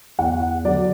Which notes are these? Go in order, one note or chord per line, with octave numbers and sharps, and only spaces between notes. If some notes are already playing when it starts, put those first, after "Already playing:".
E2 F#5
D3 F#3 D5